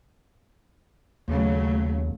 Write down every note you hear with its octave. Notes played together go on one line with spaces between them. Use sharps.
D#2 C#3 F#3 A3